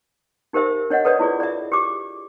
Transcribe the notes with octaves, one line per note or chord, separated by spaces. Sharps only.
D#4 G4 A#4 C5 E5
D4 C#5 D#5 F#5
A4 B4 C#5 D5
E4 F4 G#4 D5
D5 E5
G4 D6